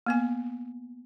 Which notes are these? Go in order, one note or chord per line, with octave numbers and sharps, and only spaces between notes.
A#3 B3 G#5